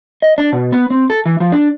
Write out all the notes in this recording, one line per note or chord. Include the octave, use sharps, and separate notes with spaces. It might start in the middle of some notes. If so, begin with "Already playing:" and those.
D#5
D4
B2
B3
C4
A4
E3
F3
D4